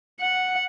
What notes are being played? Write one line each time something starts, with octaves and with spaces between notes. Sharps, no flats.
F#5